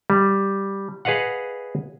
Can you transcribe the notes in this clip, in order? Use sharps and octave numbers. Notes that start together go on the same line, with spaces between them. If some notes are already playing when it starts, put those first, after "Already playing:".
G3
G#4 B4 D#5 F5 F#5